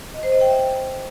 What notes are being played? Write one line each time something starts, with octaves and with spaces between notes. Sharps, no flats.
D#5
C5
D#5
G5
E5